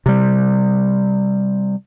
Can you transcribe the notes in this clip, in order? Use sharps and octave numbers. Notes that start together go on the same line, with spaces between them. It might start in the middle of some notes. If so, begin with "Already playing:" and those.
C3 G3